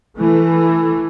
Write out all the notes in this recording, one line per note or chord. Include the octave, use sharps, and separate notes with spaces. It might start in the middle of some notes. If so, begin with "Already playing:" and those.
E3 A3